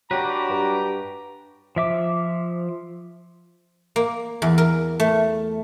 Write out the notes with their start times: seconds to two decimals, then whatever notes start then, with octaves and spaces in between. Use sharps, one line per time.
0.11 F#3 D4 F#4 G4 B4 A#5
0.50 G2
1.76 F3 E5 D6
3.96 A#3
4.42 E2
4.58 A#4
5.00 A3